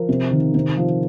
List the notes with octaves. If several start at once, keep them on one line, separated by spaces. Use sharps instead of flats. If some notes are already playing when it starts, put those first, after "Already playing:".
Already playing: F3 A#4
C3
D#3
C3
F3